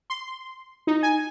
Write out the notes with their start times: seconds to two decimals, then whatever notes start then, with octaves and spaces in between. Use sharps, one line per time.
0.10 C6
0.87 D#4
1.03 G#5